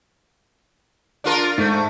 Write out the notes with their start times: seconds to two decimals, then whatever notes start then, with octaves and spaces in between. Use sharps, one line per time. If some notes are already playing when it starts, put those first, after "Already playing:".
1.24 D4 F4 A#4
1.58 G#2 A3